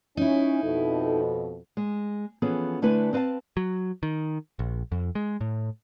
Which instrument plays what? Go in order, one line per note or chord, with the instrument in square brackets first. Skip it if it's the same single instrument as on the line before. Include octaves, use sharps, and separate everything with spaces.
[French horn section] C#4 [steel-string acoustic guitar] D#4 E4
[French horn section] F2 B2 A4
[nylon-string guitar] G#3
E3 F3 B3 C#4 G#4 A4
D3 A3 D4 E4 B4 G#5
C4 B4 D#5 F5 A5
[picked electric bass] F#3
D#3
A#1
F2
G#3
A2